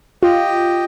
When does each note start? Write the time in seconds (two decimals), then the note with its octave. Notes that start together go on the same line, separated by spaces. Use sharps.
0.23 F4 G4 D#5 G5